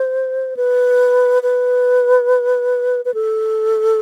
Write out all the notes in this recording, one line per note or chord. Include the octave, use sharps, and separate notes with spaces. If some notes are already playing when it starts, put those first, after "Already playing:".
Already playing: C5
B4
B4
B4
A4